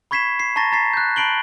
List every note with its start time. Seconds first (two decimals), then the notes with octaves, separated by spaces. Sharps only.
0.11 B5 C#6 G#6 B6 C7 E7
0.40 C7
0.56 A5 A#5 C#6 A6 A#6
0.72 A#5 A6 B6 C7
0.93 F#6 G6
1.16 A5 B5 C7 D7 F#7 G7